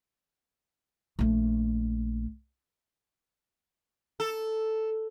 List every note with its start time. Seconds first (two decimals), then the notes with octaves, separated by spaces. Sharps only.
1.19 A#1 A3
4.20 A4